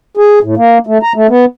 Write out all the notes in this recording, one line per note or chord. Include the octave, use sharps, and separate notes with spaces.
G#4
A2
A#3
A3
A#5
A3
B3